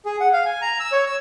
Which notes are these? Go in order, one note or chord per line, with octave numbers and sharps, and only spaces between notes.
G#4
F#5
F5
G#5
A#5
E6
C#5
E6